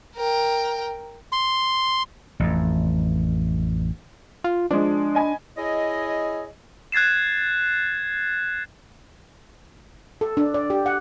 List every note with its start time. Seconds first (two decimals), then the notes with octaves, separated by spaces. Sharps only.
0.16 A#4 G5
1.32 C6
2.40 A1 F2
4.44 F4
4.71 F3 G#3 D4
5.15 D#5 G#5 B5
5.56 E4 G#4 C#5 D#5
6.92 F#6 G#6 A6 C7 E7
10.21 A4
10.37 D4
10.54 D5
10.70 G4
10.86 F#5